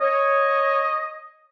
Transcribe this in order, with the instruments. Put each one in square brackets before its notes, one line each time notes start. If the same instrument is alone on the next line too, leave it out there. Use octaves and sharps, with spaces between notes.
[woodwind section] C#5 [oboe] D#5